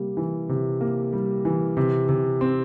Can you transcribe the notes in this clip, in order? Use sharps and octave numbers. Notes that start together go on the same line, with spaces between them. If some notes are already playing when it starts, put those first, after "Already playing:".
Already playing: C3 G3 A#3
E3
C3
A#3
G3
E3
C3
C3
C4